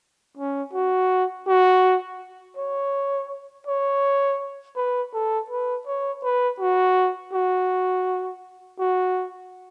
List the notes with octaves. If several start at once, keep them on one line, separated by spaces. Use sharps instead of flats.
C#4
F#4
F#4
C#5
C#5
B4
A4
B4
C#5
B4
F#4
F#4
F#4